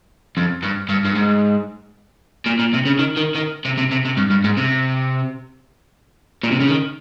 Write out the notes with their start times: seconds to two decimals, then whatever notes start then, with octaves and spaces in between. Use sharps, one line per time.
0.37 F2
0.63 G2
0.89 G2
1.05 G2
1.15 G#2
2.46 A#2
2.59 A#2
2.74 C3
2.86 C#3
2.99 D#3
3.16 D#3
3.35 D#3
3.65 C3
3.78 C3
3.91 C3
4.05 C3
4.17 G2
4.30 G2
4.44 G#2
4.57 C3
6.43 A#2
6.52 C3
6.60 C#3
6.68 D#3